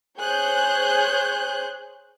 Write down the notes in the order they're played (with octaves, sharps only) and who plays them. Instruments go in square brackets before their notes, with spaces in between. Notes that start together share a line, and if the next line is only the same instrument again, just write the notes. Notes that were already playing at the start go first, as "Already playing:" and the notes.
[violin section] G#4 C5 C#5 F#6 G6